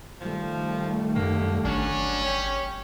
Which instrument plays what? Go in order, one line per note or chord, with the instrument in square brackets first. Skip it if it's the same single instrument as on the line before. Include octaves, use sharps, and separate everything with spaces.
[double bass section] D#3 G3 A3 [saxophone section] F3
[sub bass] F#2 [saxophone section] D3 A#3 G4
[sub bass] G1 [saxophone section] F#3 D4 [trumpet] C#4
[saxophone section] G4 C#5